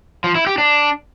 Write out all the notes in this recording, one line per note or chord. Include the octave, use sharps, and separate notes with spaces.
F3
E4
G4
D4